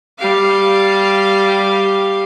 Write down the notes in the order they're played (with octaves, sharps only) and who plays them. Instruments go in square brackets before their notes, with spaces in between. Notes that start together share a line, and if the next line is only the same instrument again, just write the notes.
[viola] G3 F5